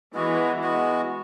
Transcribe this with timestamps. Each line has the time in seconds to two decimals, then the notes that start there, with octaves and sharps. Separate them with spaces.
0.14 E3 G#3 B3 F#4
0.62 G#3 B3 F#4